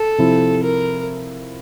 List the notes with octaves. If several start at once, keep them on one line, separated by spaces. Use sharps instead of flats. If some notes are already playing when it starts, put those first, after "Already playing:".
Already playing: A4
C3 F3 C4 E4
A#4